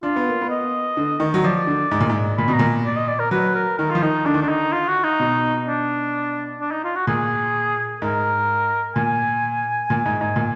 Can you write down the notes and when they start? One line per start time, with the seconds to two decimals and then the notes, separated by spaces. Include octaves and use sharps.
0.03 D4 F4
0.16 B3
0.28 A#3
0.42 B3
0.50 D#5
0.97 D3
1.20 D#3
1.34 F#3
1.44 F3 D5
1.67 D3
1.91 G#2
2.00 A#2
2.10 G#2
2.38 A#2 B5
2.48 B2
2.53 A#5
2.59 A#2
2.86 D5
2.96 D#5
3.08 D5
3.19 A#4
3.31 F#3 B4
3.55 A#4
3.78 D#3 A#4
3.91 F3 F4
4.02 D#3 D#4
4.26 D3 D4
4.34 D#3
4.42 D3 D4
4.49 D#4
4.72 F4
4.88 F#4
5.04 D#4
5.19 B2
5.66 D4
6.60 D4
6.72 D#4
6.84 F4
6.96 F#4
7.07 A#2 G#4
8.01 G#2 A#4
8.96 A#2 G#5
9.90 A#2
10.06 G#2
10.21 G#2
10.36 A#2